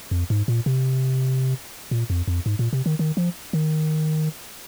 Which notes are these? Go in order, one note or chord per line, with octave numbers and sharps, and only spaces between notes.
F2
G#2
A#2
C3
A#2
F2
F2
G#2
A#2
C3
D#3
D#3
F3
D#3